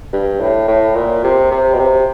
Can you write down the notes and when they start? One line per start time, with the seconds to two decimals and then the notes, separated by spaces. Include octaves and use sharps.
0.13 G2
0.40 A2
0.68 A2
0.95 A#2
1.24 C3
1.51 C3
1.74 B2
1.79 C3